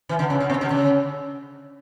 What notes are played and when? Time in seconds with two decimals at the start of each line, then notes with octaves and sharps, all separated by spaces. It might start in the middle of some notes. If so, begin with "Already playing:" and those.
0.09 E3
0.19 D3
0.30 C#3
0.40 D3
0.50 B2
0.61 D3
0.71 C#3